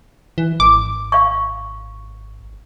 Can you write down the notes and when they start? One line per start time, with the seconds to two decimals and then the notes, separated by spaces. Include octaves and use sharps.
0.38 E3
0.60 G#1 D6
1.12 F5 C#6